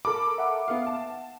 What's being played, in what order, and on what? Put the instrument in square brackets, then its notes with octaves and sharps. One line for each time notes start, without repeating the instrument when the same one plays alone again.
[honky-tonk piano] A4 A#4 B5 [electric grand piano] D6
[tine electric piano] E5 F#5
[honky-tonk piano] B3 F5
A5